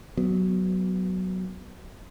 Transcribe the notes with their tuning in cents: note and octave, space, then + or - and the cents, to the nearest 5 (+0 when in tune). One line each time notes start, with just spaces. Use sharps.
F#3 +5 B3 +0